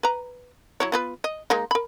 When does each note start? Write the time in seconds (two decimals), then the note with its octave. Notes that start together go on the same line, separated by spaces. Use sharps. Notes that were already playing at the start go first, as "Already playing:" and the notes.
0.03 B4 A#5
0.80 F#3 E4 C#5
0.92 B3 F4 B4
1.24 D#5
1.50 G#3 A#3 D#4
1.71 A#4 B5